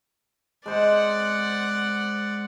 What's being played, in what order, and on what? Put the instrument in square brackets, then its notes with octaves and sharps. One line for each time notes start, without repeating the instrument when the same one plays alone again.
[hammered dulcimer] G#3 C5 [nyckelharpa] D5 F#5